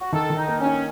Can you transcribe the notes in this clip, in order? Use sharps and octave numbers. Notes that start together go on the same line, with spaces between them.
F#4
D#3 A4
D#3
D#4
A#3
C#4
D#4